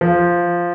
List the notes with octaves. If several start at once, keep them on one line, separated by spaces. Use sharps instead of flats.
F3